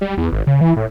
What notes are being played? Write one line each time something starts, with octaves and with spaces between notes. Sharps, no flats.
G3
E2
G#1
C#3
E3
A2